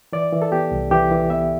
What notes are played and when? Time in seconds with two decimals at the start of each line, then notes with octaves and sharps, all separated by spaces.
0.13 E3 D5
0.33 E3
0.42 A4
0.52 B3 G4
0.71 C2
0.91 E3 G4
1.11 E3
1.30 B3 E5